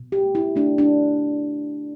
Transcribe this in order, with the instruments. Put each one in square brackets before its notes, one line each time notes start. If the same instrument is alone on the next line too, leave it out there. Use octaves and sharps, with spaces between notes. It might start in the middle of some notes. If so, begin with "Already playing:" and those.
Already playing: [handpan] B2
G4
A3
E4
A3 D4
D4